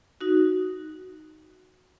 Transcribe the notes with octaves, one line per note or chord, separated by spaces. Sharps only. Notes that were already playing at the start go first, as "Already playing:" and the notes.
D#4 F#4